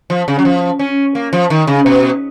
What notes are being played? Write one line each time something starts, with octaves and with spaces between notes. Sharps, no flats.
F3
C#3
F#3
F3
C#4
A#3
F3
D#3
C#3
B2